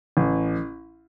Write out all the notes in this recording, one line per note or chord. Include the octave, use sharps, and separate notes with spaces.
A1